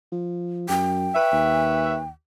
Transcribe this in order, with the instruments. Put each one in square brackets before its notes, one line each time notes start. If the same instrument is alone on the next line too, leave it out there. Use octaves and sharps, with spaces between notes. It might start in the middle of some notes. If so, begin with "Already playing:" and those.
[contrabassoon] F3
[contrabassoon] F#2 [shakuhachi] G5
[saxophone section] B4 C#5 E5
[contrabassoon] D#2